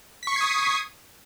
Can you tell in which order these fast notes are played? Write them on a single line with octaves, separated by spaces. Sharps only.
B6 C#6 C7 G#6 D#6